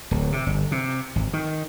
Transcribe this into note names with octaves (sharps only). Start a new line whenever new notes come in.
D1
C3
G1
C3
G#1
D#3